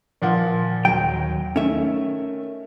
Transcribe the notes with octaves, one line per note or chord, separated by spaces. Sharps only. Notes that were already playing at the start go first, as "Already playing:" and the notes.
A#2 F3 F#5
D#2 F#3 G5
D#3 A3 C#4 E5